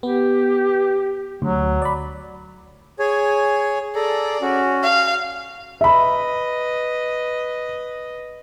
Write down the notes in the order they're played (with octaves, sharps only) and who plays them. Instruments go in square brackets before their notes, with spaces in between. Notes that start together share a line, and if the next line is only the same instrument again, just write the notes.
[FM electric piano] B3 [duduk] G4
[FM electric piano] D2 [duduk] F#3
[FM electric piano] D5 B5
[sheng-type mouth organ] G#4 C#5 G#5
[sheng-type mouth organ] G#4 A4 A#5 [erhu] D5
[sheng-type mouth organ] C#4 F#4
[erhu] F5
[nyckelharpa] B4 D#5 [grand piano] E5 B5